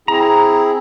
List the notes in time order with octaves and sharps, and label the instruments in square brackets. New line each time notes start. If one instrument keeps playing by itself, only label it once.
[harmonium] C4 E4 G#4 [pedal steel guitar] A#5